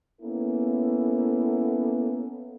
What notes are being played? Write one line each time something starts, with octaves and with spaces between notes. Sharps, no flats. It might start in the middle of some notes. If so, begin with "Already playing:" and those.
A#3 B3 C#4 E4 A4